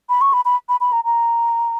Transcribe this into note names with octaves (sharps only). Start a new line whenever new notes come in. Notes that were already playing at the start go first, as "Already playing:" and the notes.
B5
C#6
B5
B5
B5
B5
A#5
A#5